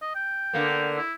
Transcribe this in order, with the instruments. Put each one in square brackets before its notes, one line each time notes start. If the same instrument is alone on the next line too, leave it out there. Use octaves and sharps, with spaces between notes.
[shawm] D#5
G5
[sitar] D3 A#3 B3
[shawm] E4